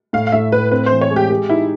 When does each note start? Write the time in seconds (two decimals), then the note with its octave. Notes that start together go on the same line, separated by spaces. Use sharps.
0.13 A2 F5
0.27 F5
0.32 A2 E5
0.52 A2 B4
0.71 C4 B4
0.86 E3 C5
1.01 C#5
1.11 G#3
1.16 G4
1.30 G4
1.50 D#4 E4